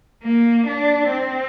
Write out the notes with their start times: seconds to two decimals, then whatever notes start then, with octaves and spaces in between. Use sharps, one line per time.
0.23 A#3
0.67 D4
1.11 C4